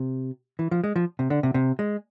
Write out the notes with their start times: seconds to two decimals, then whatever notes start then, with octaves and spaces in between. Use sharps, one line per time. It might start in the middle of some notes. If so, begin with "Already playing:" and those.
Already playing: C3
0.59 E3
0.71 F3
0.84 G#3
0.96 F3
1.19 C3
1.30 D3
1.43 C3
1.54 C3
1.79 G#3